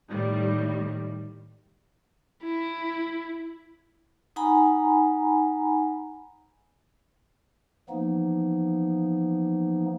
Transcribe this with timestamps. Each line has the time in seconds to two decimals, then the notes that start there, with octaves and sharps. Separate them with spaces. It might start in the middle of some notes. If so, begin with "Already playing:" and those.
0.11 A2 D#3 G3
2.43 E4
4.36 D#4 F#5 G#5 A#5 B5
7.89 E3 F3 A#3 B3 D#4